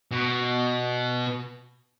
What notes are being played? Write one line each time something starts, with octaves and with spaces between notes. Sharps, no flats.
B2